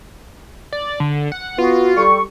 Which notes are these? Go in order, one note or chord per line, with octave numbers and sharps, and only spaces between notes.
D5
D3
F#5
B3 F4 F#4
G3 A4 C#6